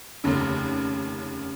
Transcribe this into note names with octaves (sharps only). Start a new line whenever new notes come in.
F1 D#2 C#3